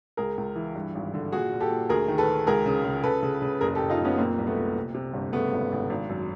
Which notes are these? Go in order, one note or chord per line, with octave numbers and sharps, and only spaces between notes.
C#2 G#4 A#4
C#2
E3
G2
G#1
D3
A#2 F#4 G#4
A#2
G4 A4
A#2
D2 G#4 A#4
D#3
A4 B4
D#3
C#2 G#4 A#4
C#3
C#3
C#3 A4 B4
C#3
C#3
F#1 G#4 A#4
G4 A4
F#1
D#4 F4
F#1
B3 C#4
A#2 A#3 C4
C2
A3 B3
A#2
C3
C3
G1
C#3 A3 B3
G#1
G#1
G#1
F#2